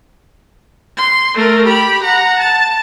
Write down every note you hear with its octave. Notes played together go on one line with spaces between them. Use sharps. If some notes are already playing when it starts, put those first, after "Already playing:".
C6
A3 A#4
G4 B5
F#5 A#5
A5